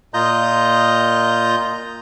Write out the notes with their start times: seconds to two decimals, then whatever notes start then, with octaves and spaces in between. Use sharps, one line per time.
0.14 A#2 F4 D#5 A#5 G6